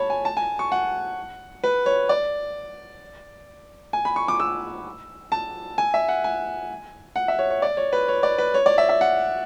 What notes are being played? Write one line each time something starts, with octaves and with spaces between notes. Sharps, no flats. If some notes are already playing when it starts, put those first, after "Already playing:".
Already playing: C#5 A5 B5
G#5
A5
G#5
C#6
F#5
B4
C#5
D5
G#5
B5
C#6
D6
E6
A5
G#5
E5
F#5
G#5
F#5
E5
C#5
C#5
D5
C#5
B4
C#5
D5
B4
C#5
D5
E5
E5
F#5